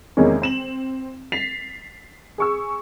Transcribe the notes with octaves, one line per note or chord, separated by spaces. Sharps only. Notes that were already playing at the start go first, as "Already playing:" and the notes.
E2 C3 D#3 G#3 A#3 C#4
C4 E7 F#7
A6 B6 C7 F7
G#4 C#6 E6